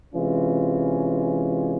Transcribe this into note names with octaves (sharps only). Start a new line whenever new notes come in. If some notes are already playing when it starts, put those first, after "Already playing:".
C3 E3 G#3 C#4 F4